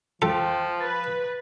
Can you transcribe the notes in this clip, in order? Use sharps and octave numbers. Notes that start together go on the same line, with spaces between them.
F3 F4 A4 G5
B4 A6